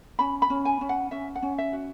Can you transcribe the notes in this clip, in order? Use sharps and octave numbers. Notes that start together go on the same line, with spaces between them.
C#4 B5
B5
C#4
G#5
C#4
F#5
C#4 E5
F#5
C#4
E5
F#4